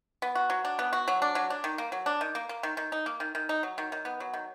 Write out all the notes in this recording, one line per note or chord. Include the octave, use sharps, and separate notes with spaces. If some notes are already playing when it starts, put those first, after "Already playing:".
B3
F#4
F#3
D4
B3
F#4
F#3
D4
F#3
D4
D#3
A#3
F#3
D4
D#3
A#3
A#3
D#3
D#3
D#4
A#3
D#3
D#3
D#4
F#3
D#3
D#3
B3
F#3
D#3